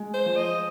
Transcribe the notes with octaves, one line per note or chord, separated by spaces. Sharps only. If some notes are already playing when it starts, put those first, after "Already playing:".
Already playing: G#3
C5
F3
D#5